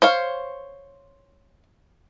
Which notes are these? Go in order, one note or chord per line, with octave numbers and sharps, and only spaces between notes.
C5 C#5 F5